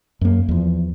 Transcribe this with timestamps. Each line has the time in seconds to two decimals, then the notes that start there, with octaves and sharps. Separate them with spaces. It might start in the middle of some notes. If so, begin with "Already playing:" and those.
0.21 F#2 A#3
0.49 E2 F3